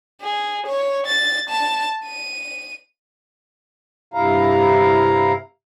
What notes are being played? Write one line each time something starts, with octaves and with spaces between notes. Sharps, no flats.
G#4
C#5
A6
A5
D#7
G2 C3 E4 F5 A#5